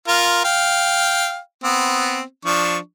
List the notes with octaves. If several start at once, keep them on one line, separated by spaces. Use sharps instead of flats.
F4 A#4
F5 G5
B3 C4
F3 D4 C#6